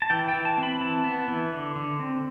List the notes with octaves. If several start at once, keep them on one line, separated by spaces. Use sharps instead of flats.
A5
E3 G5
G5
E3
A5
C4
B5
E3 A5
B3
E3
D3
D3
C4